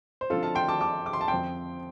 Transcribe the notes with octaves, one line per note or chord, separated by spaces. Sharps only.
C5
D3 F3 C4 F4 A4
F5 A5
G5 C6
A5 D6
A5 D6
D6
C6
A5
F2 F3 C4 G5 C6